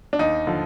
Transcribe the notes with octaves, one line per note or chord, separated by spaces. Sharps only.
D4
D#2 D#4
D3 F3